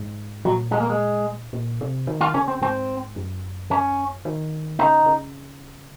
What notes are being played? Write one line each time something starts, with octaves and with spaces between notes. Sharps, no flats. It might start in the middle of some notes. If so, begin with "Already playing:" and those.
Already playing: G#2
A#2 F#3
G#3
A#3
G#3
A#2
C3
D#3
F4
C#3 C#4
C4
G#2 C4
F#2
C#4
D#3
C#3 D#4
C#3